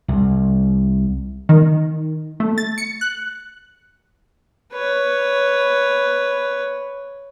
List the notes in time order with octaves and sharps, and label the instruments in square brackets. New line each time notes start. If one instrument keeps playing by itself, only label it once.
[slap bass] C2
[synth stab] D#3
A3
A6
C#7
F#6
[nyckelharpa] B4 C#5